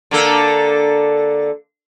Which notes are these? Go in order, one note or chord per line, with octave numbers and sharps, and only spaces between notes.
D3 A#3 A4